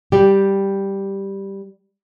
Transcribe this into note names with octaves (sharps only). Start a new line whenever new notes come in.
G3 G4